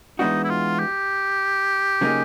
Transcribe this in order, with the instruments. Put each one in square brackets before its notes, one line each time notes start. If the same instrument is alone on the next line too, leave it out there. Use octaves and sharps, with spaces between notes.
[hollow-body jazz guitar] E3 G#3 B3 D4 F#4 [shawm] D#4
[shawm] E4
F4
G4
[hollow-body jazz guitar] C#3 F#3 A#3 D#4 G#4